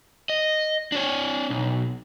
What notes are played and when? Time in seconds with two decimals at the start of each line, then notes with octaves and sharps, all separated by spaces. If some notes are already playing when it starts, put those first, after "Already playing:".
0.30 D#5
0.92 D4 C#5
1.50 B1